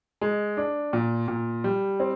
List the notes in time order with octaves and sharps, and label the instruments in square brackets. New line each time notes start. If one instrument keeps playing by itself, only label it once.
[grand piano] G#3
D4
A#2
A#2
G3
C4